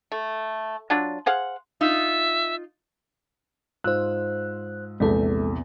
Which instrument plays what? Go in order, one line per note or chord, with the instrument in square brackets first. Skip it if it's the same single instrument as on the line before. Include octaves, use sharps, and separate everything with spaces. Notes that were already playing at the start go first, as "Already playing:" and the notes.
[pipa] A3
F#3 D4 F4
G#4 C5 F5 F#5
[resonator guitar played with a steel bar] D#4 F4 [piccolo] E5
[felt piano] G#2 F4 E6 [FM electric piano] C5 F#6
[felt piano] A#1 E2 C3 [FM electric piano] G#3 A4